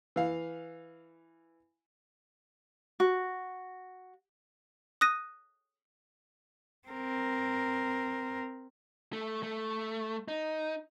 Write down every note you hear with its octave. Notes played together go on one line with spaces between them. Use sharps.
E3 F5
F#4
D#6 F#6 A#6 D#7
C4 A#4
A3
A3
D#4